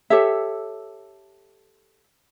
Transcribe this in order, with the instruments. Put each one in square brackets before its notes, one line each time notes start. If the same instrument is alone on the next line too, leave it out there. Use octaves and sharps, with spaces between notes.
[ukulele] G4 A4 C#5 E5